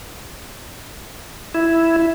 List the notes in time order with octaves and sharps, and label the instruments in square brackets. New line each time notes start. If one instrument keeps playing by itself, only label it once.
[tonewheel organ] E4